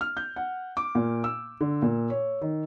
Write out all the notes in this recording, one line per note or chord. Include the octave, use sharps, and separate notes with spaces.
F6
G6
F#5
D6
A#2
E6
D3
A#2
C#5
D#3